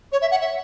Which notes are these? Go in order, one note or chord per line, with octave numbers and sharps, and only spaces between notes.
C#5
E5
F#5
E5